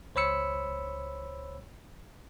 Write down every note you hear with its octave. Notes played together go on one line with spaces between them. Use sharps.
C#2 C5 C#5 B5 E6 C#7